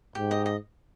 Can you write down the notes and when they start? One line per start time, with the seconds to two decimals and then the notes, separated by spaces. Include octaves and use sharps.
0.15 G#2 G4
0.31 D#5
0.46 D#5